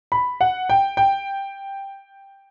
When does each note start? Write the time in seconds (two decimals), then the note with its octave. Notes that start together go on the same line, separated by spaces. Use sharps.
0.12 B5
0.41 F#5
0.70 G5
0.97 G5